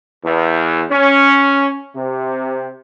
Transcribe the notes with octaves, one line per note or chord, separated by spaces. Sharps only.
E2
C#4
C3